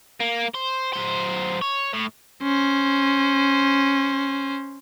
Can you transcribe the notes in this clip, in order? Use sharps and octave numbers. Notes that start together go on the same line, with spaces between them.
A#3
C5
F#2 C5
C#5
A2
C#4 C5